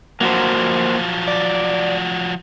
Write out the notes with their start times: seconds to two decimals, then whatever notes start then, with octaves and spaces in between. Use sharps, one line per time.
0.21 F3 F#3 A#3 F#4 C5
1.28 D5